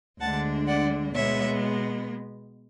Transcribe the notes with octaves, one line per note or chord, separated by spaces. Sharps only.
D2 D3 G#3 D4 F#5 A5
D5 F#5
B2 G#3 B3 C#5 E5